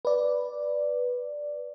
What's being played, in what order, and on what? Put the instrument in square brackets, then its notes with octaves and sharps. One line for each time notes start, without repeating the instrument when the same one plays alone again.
[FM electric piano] B4 D5